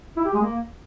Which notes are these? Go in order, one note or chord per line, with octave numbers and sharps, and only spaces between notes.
E4
G4
G#3
A#3